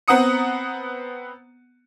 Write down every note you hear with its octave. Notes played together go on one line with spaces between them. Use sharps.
B3 C4 F#5 A#5 D#6 C#7